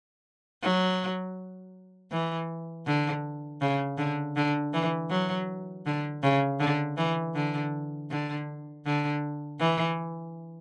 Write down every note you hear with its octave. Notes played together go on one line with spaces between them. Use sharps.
F#3
E3
D3
C#3
D3
D3
E3
F#3
D3
C#3
D3
E3
D3
D3
D3
E3